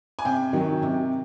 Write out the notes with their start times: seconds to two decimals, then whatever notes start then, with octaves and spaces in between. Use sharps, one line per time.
0.19 G#5
0.25 C3 G5
0.53 D#3 F#3
0.82 C3